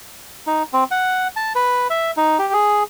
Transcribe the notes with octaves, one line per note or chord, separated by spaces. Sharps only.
D#4
C4
F#5
A5
B4
E5
D#4
G4
G#4